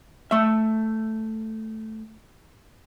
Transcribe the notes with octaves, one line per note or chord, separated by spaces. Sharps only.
A3 E5